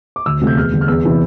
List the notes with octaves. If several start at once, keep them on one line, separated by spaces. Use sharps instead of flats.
D6
D2 E6
C3 F3 A3
G6
E2 F6
D3 G3
F6
E2 E6
C3 E3